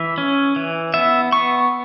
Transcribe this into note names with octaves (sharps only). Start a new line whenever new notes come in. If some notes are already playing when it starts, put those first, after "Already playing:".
Already playing: E3 E5
C#4
E3
B3 E5
B3 C#6